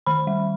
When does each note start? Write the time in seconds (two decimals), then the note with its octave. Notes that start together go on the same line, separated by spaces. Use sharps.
0.06 D#3 B5
0.27 G3